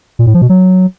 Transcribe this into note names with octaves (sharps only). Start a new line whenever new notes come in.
A#2
A2
F3
B2
F#3